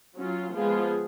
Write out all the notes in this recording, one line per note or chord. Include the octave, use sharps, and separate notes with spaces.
F#3 C#4 F4
F3 G#3 B3 F4 G#4